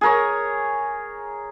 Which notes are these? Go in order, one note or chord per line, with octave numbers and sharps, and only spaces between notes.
G#4 A#4 C#5